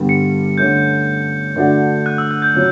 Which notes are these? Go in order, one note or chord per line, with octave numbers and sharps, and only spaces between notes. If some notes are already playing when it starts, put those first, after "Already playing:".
Already playing: G2 D3 G3 B3
C#7
D3 A3 C#4 G6
D3 A3 D4 F#4
F#6
E6
F#6
G6
C#3 F#3